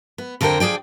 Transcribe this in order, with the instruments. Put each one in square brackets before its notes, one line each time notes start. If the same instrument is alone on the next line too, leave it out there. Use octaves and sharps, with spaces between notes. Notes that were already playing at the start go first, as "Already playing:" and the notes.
[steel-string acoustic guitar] B3
F2 D3 A4 A#4 C5 G5
F3 G#4 D5 G5